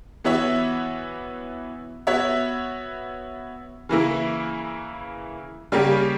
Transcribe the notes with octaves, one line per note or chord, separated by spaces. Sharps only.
E3 B3 F#4 C#5 E5
B3 F#4 C#5 E5
C#3 E3 A#3 E4
C#3 G3 A#3 C#4 G4